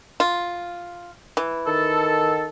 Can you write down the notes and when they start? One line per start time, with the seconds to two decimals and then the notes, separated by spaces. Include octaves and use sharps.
0.20 F4
1.37 E3
1.67 D#3 A4